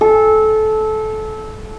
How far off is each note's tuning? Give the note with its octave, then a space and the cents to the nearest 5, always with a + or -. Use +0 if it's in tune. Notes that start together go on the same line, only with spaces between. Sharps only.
A4 -20